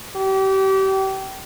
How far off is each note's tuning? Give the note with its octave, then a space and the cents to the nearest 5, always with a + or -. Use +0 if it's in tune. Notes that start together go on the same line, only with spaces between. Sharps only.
G4 -30